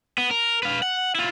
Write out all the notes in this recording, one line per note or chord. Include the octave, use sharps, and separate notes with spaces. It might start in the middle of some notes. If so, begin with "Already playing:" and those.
B3
A#4
B4 F5
F#5
E4 F4